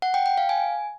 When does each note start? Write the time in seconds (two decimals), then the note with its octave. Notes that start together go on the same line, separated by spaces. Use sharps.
0.02 F#5
0.14 G5
0.26 G5
0.38 F5
0.49 G#5